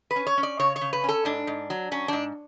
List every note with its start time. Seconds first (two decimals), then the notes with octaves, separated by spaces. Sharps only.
0.11 B4
0.16 C#4
0.27 C#5
0.38 C#4
0.43 D5
0.59 C#3 C#5
0.76 C#5
0.81 C#3
0.93 B4
1.04 C#4 A4
1.25 G#2 D4
1.47 G#2
1.70 F#3
1.91 F#3 C#4
2.08 G#2 D4